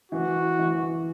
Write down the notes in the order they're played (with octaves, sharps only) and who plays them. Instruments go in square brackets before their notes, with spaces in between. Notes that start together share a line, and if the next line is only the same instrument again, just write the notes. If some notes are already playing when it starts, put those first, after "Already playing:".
[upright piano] E3 [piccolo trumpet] F#4
[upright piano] E3